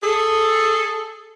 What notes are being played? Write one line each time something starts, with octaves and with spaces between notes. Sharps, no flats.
G#4 A4